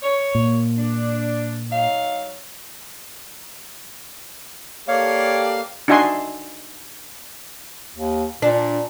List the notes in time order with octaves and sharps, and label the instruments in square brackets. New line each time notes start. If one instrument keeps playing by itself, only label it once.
[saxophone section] C#5
[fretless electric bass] A#2
[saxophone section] D4
F#3 D#4 F5
[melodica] A#3 F5 [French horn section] G4 A4 D5 [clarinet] C#5
[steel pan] D4 D#4 F#4 E5 G#5 C6
[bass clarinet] D#2
[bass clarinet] A#2 [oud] D4